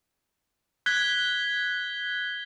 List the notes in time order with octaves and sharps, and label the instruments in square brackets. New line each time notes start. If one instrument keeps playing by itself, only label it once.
[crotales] F#6 G#6 B6 G7